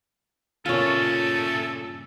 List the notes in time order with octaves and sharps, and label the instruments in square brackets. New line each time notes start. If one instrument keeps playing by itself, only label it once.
[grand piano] G2 A#2 C#3 [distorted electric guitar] A3 C#4 [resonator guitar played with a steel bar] F4 C#5 [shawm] A4